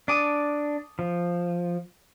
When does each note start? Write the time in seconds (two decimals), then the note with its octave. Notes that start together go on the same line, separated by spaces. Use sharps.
0.08 D4 A5 D6 D#6
0.99 F3